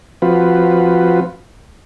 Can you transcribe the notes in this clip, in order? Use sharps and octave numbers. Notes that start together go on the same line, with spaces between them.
F3 C4 F4 F#4 B4